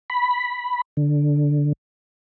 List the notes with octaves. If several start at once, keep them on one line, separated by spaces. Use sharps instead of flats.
B5
D3